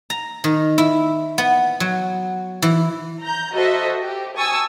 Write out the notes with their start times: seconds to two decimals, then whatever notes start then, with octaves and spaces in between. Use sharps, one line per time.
0.10 A#5
0.44 D#3
0.78 E4
1.38 B3
1.80 F#3
2.62 E3
3.23 A#5 G6
3.55 F#4 A4 C5 D#5 E5
4.02 G4
4.37 G#5 A5 C#6 D#6 E6